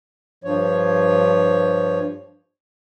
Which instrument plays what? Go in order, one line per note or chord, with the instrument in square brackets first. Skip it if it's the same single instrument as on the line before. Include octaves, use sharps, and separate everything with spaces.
[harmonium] G2 F3 C#5